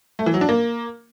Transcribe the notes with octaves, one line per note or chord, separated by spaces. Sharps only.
A3
E3
F#3
D4
A#3